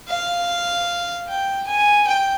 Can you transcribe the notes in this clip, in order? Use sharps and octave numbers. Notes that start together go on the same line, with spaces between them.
F5
G5
G#5
G5